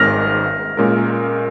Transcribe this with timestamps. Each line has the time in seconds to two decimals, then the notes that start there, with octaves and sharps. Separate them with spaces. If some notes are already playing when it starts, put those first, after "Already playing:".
Already playing: G#1 G#2 D#3 C#4 A#4 F6 A#6
0.77 A#2 G#3 C#4 A#4